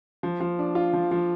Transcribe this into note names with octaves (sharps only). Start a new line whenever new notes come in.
F3
F3
D4
F4
F3
F3